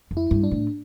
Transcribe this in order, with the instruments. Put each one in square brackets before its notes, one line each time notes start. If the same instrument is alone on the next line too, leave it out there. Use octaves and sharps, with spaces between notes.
[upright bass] F2
[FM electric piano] E4
[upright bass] G2
[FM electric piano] D4
[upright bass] A2